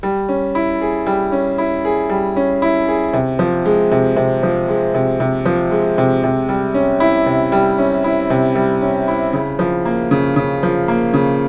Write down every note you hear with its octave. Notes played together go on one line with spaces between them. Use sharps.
G3
C#4
E4
G#4
G3
C#4
E4
G#4
G3
C#4
E4
G#4
C3
F3
G#3
C3
C3
F3
G#3
C3
C3
F3
G#3
C3
C3
G3
C#4
E4
C3
G3
C#4
E4
C3
G3
C#4
E4
C#3
F3
A#3
C#3
C#3
F3
A#3
C#3